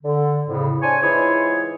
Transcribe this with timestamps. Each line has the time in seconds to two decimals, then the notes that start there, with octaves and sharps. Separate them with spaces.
0.04 D3
0.48 F2 A2 C#3
0.82 D4 C5 C#5 G#5
1.02 G#2 E3 E4 F4 G#4 C#5